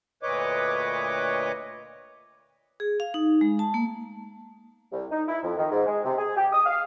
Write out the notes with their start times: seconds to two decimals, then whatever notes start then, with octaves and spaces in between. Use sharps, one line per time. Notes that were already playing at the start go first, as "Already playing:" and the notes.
0.23 D2 A#2 B4 C#5 D#5 D6
2.80 G#4
3.00 F5
3.14 D#4
3.41 G#3
3.59 A5
3.74 A#3
4.93 C2
5.11 D#4
5.28 E4
5.44 F2
5.58 D#3
5.71 G#2
5.86 G#3
6.05 C3
6.18 G#4
6.37 G4
6.53 D#6
6.66 F5